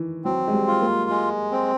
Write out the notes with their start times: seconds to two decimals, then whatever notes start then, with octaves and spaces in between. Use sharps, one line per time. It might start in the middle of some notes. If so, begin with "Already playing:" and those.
Already playing: D#3 E3
0.25 F#3 C4
0.48 G#3
0.53 G3
0.68 F4
0.81 A#3
1.10 G#3
1.52 C4